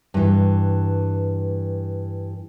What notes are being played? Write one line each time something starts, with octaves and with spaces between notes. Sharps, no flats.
G2 E3